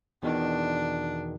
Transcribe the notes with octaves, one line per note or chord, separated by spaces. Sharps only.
E2 B2 D#3 D4